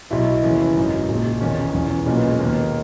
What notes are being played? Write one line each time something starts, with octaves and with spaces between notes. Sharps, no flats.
B1 B2 E4
D#2 C#3 E3
G#1 F#2 C#3 D#4
A#1 A#2
E1 E2 D#3 C#4
E1 E2 C#3 E3
B1 A#2 C#4
B3
G#3
D#2 D#3 A#3